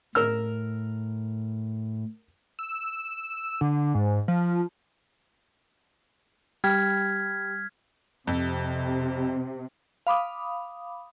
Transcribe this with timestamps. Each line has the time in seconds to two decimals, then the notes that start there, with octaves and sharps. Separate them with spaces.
0.15 A2 A#4 E6 F6
2.59 E6
3.61 D3
3.95 G#2
4.28 F3
6.64 G3 F6 G#6 B6
8.27 F2 C3
10.07 F5 B5 D6 D#6